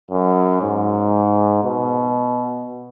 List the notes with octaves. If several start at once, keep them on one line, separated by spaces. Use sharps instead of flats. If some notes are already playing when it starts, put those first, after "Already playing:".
F#2
G#2
B2